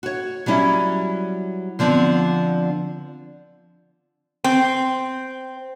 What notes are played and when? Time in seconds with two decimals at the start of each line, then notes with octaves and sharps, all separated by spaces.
0.03 F#4 C#5
0.46 F#3 G3 C#4 E4
1.79 D3 F3 B3 C4
4.44 C4